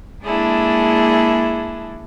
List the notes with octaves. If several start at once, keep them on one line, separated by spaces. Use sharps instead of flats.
G#3 A#3 D4 E4 G#4 A4